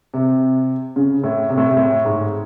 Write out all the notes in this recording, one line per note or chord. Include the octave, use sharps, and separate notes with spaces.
C3
C#3
A2
C3
A2
C3
A2
G#2